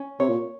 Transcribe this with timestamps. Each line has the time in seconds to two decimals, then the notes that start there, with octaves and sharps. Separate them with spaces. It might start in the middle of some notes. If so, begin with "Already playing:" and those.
Already playing: C#4
0.20 C3 C#5
0.29 A#2